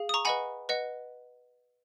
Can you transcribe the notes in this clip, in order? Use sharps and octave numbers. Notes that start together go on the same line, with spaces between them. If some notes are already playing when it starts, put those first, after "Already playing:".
Already playing: G#4 F5
D#6
A#5 C#6
B4 D#5 F#5 G#5 B5
B4 D#5 F#5